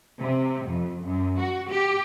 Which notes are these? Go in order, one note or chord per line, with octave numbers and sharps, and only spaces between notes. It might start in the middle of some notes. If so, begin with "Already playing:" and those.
C3
F2
F#2
F#4
G4